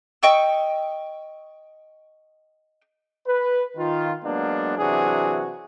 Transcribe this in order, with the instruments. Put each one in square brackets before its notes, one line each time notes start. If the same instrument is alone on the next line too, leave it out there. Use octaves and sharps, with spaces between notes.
[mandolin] D#5 G5 C#6 E6
[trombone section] B4
D#3 F4
F#3 G#3 A#3 B3 D4
C3 E3 F#3 D4 F#4 G#4